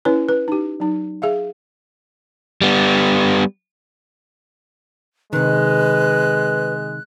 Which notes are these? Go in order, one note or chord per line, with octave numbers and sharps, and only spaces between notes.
C#4 E4 B4 C#5
B4
D#4 G4
F#3 D#4
G#4 E5 F5
G3 B3
C3 D#3 G#3 B4 F#6